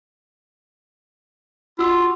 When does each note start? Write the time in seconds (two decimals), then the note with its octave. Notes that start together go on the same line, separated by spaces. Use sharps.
1.79 F4 F#4 E6